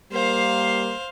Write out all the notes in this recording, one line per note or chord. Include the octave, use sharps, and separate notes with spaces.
G3 A#3 C5 F5